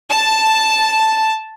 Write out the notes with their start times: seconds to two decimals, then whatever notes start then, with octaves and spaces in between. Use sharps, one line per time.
0.10 A5